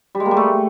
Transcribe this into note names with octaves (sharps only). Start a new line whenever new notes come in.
G3
G#3
A#3
G3
A3